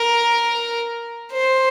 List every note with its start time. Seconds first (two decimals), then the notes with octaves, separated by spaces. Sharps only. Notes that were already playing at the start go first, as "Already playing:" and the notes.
Already playing: A#4
1.32 C5